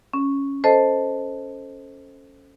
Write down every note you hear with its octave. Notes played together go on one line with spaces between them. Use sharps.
C#4
A4 C5 D#5 A5